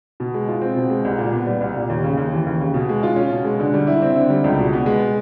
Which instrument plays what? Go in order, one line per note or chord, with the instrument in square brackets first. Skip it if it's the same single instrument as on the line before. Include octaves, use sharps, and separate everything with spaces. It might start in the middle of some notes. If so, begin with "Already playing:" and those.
[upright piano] B2
G#3
F4
C4
B2
G#3
C2
A#2
B3
G3
C2
A#2
D#2
C#3
D#2
E3
D#2
C#3
B2
G#3
F4
C#4
B2
G#3
D3
G3
E4
C4
D3
G3
C#2
B2
B3
G#3